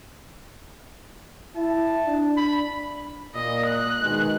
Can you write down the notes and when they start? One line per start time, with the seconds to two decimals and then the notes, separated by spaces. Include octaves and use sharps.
1.56 E4 A5
2.06 D4
2.37 B5
3.35 A#2 D#5
3.67 F#6
4.02 B2 D#3 G#3